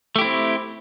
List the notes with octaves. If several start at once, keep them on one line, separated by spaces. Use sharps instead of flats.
A3 C4 E4 G4